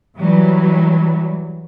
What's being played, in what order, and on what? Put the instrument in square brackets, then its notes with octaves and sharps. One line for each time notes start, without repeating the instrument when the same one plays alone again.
[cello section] E3 F#3 G3